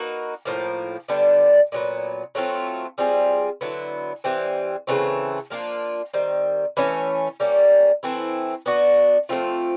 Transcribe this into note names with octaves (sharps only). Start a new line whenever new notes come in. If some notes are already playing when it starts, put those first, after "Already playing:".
Already playing: A#3 D#4 F#4 B4
A2 F3 A#3
D3 G3 B3 D4
A#2 F#3 B3
F#3 A3 C4 F4
G3 C4 F4 G#4
D3 F#3 B3 E4
E3 G3 C4
C#3 E3 A3 C4
F3 A#3 D4 F4
D#3 G3 C4
E3 A3 C#4
G3 A#3 C#4
E3 A3 C4 E4
B3 D4 F#4
F3 A3 C4 F4